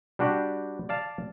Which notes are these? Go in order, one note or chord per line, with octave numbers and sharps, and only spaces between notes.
G3 D4 F#4 G4
D5 F5 A5